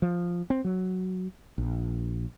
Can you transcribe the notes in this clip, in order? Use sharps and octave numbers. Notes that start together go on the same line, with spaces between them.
F3
C4
F#3
A#1